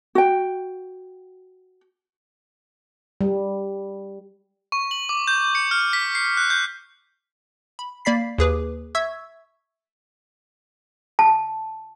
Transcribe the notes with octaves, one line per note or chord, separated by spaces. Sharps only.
F#4 G5
G3
C#6
F#7
D6
G6
C#7
F6
B6
C7
F#6
G6
B5
A#3 D5 B5 B6 C7
D#2 G#4 B4 D6
E5 C#6 E6 G#6
A5